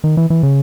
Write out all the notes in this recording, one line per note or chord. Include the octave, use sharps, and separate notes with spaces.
D#3
E3
E3
C#3